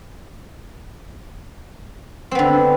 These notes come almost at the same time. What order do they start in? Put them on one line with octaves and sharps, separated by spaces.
C4 B3 D3